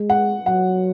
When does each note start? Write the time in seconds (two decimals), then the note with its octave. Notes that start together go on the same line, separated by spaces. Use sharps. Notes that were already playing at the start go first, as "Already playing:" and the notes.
Already playing: G#3
0.10 F#5
0.46 F#3 F#5